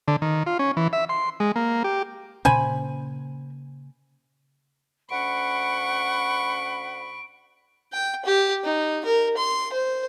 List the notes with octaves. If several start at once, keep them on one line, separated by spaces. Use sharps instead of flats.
D3
D#3
F4
C#4
E3
E5
C6
G#3
A#3
G4
A#2 C#3 C#4 C5 G#5 B5
D2 C#4 F#5 B5 C#6 D7
G5
G4
D#4
A#4
C6
C5